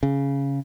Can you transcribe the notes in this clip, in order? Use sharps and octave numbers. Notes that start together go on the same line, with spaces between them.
C#3